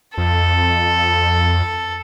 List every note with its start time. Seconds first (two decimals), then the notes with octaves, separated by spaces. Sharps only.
0.18 F2 A4